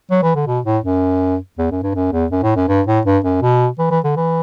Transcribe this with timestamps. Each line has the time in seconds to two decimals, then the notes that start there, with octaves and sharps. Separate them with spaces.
0.11 F#3
0.23 E3
0.35 D3
0.47 B2
0.65 A2
0.84 F#2
1.58 E2
1.71 F#2
1.83 G2
1.95 F#2
2.13 E2
2.32 F#2
2.43 A2
2.56 F#2
2.68 G2
2.87 A2
3.05 G2
3.24 F#2
3.42 B2
3.79 E3
3.91 E3
4.04 D3
4.16 E3